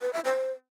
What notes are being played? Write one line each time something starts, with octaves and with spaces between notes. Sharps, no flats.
B4
E5
C5